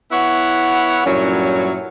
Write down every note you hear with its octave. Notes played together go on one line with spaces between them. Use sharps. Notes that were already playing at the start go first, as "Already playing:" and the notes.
B3 E4 C#5 F#5
G2 A#2 F#3 C#4 E4